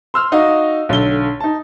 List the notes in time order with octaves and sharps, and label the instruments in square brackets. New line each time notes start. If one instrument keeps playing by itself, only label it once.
[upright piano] C6 E6 F6
D#4 F#4 D#5 F5
B1 D3 G7
D#4 A5